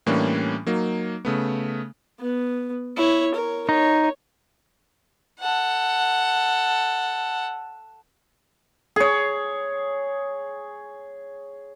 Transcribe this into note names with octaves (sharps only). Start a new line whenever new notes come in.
A2 E3 G3 A#3 C#4 D4
F#3 A#3 D#4
C#3 A3 B3
B3
E4 C#5
A#4 C#5
D#4 C#5
A4 F#5
G#4 C#5